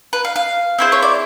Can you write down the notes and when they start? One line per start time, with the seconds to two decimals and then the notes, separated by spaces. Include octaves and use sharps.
0.13 B4
0.25 F5
0.36 F5
0.79 C4 E4 G#4 C5
0.92 C#5
1.03 D5